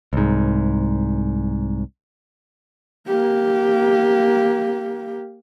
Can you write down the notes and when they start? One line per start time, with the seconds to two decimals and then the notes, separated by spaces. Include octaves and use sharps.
0.13 C2 G#2
3.08 A#3 G4